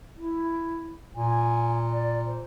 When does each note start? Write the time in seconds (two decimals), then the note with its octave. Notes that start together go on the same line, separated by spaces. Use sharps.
0.17 E4
1.15 A#2 G#5
1.88 D5
2.27 C5